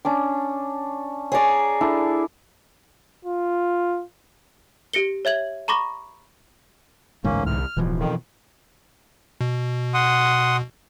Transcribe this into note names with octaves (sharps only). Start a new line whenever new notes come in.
C#4 D4 D6
G#4 C#5 D5 A#5 C#6
D4 E4 A4
F4
G4 A#6 C#7 G7
C#5 E5 G#6 F#7
A#5 B5 C#6 D6 A#6
A1 D2 G#2 A#3 C#4
C2 F6
D1 B2 E3 F3
F2 D#3
B2
F#5 C6 D#6